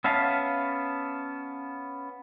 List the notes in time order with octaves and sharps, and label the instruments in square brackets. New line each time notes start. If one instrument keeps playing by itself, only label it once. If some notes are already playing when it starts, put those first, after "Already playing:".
[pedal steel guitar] B3 C#4 E5 F5 A5